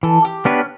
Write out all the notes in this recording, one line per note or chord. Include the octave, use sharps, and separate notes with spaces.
E3 A4
G4
B3 C#4 D4 G4 B4